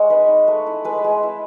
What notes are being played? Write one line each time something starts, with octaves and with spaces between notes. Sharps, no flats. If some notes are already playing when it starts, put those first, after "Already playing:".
Already playing: G#3 C#5 D#5 F#5
D#4 B4
D#4
A3
E4
G#3 B4
G#3
E4